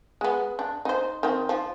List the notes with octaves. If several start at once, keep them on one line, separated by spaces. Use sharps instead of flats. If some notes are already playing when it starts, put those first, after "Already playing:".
G#3 B3
D4
D#4 C5
D#3 C4
F3